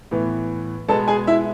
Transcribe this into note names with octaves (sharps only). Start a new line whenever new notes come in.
A2 E3 B3
B2 G#3 B3 A4 A5
G#4 G#5
E4 E5